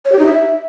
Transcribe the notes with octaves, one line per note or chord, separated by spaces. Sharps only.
C#5
G4
D#4
E5